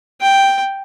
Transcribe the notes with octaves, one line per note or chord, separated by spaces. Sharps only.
G5